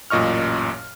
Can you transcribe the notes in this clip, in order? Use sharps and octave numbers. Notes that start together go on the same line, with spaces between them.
A1 F#2 A#2 D#5 C#6 F6